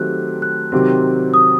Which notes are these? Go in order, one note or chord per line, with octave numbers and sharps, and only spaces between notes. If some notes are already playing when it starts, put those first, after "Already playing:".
Already playing: D#3 F#3 A3 C4 G4 F#6
F#6
C3 D#3 F#3 C4 G4
D#6